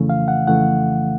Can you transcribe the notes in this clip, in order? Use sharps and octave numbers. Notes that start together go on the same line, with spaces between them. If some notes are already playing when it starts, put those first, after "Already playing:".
Already playing: F2 C#3 E3 A3
F5
F#5
F2 C#3 E3 A3 F#5